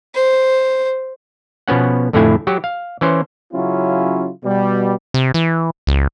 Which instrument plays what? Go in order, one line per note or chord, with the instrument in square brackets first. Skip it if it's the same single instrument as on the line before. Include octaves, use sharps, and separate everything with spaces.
[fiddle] C5
[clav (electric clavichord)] B2 F3 B3 C#4 F#5
F2 A2 D3 A3 E4 G#5
F#3 F#4 G4
F5
E3 C#4 C5
[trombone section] C#3 F#3 C#4 E4 F4
B2 G3
[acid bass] C3
E3
C#2